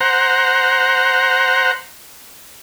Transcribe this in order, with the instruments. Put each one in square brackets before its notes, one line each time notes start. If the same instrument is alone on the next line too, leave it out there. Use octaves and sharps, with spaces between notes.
[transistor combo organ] C5 F#5 A#5